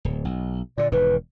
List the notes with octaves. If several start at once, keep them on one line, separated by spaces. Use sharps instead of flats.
D1
B1
A#2 D3 D5
E1 G#2 D#3 B4